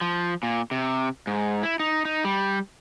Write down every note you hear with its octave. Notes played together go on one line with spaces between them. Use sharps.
F3
A#2
C3
G#2
E4
D#4
D#4
G3